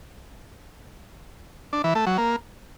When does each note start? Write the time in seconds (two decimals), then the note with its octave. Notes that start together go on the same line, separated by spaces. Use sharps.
1.73 D4
1.84 E3
1.95 A3
2.07 F#3
2.18 A#3